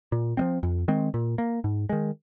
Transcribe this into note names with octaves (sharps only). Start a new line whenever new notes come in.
A#2
F3 G#3 C4
F2
D#3 G#3 C4
A#2
A#3
G#2
D#3 G#3